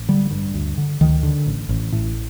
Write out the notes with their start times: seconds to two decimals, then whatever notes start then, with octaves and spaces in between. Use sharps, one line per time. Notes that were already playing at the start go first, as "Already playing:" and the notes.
Already playing: A1
0.08 D3 G3
0.31 G2
0.54 D2
0.78 D3
1.01 D2 D#3
1.23 D3
1.46 A1
1.69 A1
1.92 A2